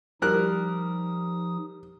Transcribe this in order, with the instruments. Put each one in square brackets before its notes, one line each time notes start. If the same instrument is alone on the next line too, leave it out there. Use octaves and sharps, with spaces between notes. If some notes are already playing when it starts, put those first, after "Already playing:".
[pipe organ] F3 D#4 D#6 [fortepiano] G3 A#4 F#6